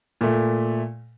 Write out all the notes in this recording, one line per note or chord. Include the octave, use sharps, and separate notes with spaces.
A#2 A3